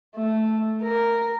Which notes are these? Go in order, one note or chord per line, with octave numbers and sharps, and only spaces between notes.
A3
A#4